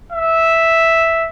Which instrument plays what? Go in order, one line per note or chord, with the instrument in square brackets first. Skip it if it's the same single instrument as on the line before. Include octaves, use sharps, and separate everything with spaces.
[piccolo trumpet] E5